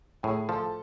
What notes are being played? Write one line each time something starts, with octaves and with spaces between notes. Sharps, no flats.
A2 G#4 G#5
F3 A4 A5